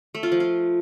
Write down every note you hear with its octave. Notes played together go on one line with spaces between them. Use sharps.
A3
F4
F3
F4